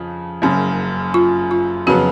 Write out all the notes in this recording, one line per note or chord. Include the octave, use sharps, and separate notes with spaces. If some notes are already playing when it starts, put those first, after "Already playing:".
Already playing: F2 C#3 F3
F#1 F#2 C#3
F4
F4
F2 C#3 F#3 B3 F#4